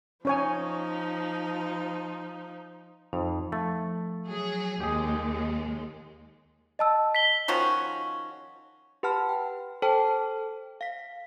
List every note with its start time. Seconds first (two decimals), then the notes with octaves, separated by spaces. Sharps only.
0.25 F3 C#4 D#4 C#5 G#5
3.13 F2 D#4
3.52 F3 A3 A6
4.26 F#3 G#4
4.80 D#2 G#3 G4 G#4
6.79 D#5 A5 E6
7.15 B6 G7
7.48 D#3 F3 C#4 F#4
9.03 G4 B4 F#5 A5 B5 F6
9.29 G5
9.82 A4 C5 G5 A5
10.81 F5 B6